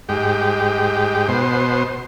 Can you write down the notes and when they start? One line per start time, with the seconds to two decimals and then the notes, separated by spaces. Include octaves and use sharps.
0.09 G#2 G4
1.28 B2 C5